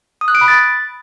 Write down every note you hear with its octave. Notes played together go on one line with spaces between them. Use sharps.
D#6
F#6
D7
B5
A6